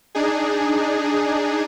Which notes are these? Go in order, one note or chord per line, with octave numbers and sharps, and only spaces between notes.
D4 D#4 G#4